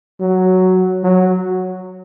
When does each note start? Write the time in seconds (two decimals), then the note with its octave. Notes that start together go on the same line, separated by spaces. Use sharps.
0.20 F#3
1.03 F#3